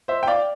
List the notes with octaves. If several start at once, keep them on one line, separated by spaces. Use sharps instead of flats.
C5 E5
G5
D5 F5